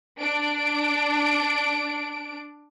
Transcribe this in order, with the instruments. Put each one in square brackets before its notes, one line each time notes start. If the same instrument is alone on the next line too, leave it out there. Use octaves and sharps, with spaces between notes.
[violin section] D4 D7